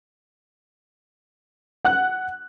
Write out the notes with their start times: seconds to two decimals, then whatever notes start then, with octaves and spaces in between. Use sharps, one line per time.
1.85 F#5 F#6